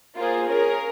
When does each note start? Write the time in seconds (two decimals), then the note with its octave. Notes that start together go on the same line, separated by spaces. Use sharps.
0.18 A#3 F4 G#4 C5
0.47 C#4 G#4 A#4